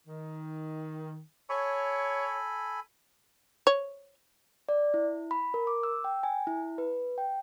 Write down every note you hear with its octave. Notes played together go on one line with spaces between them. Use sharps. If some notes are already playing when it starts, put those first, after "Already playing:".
D#3
A4 C#5 G#5 B5
C#5
D5
E4
B5
A#4
D6
E6
G5
G#5
E4
B4
G5